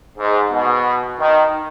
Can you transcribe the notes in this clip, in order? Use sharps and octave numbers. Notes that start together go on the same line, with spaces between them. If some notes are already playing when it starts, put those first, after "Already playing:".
G#2
B2
D#3